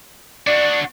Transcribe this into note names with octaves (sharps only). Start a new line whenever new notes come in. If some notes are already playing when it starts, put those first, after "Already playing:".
D4 F#4 D5